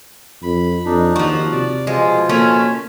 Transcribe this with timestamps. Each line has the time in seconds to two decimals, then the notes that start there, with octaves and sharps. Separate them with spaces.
0.43 F2 B5
0.86 F2 D4 D#4
1.16 D#2 F3 F#4
1.52 C3 D5
1.87 B2 F3 G#3 F4
2.29 A3 A#3 C#4 C#5